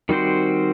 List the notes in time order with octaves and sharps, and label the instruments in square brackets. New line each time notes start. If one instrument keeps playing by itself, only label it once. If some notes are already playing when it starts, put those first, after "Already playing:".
[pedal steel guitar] D#3 G3 C4 F#4 C5